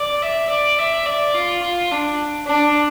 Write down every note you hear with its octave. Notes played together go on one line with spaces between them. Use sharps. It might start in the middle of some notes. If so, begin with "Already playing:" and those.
Already playing: D5
E5
D5
E5
D5
F4
F4
D4
D4